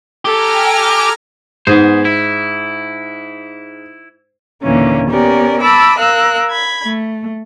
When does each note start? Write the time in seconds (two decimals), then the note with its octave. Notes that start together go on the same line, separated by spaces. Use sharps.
0.25 G4 A4 G#5 A#5 F6
1.67 G#2 B3 G#4 C5
2.05 E4
4.63 D#2 A#2 D3 E3 A#3 C#4
5.08 B3 C#4 G4 A#4 D5
5.60 A5 B5 D6 E6
5.98 A#4 F5 E6 F#6
6.50 B5 G#6
6.84 A3